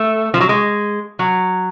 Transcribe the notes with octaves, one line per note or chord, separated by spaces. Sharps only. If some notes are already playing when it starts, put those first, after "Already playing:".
Already playing: A3
F3
F#3
G#3
F#3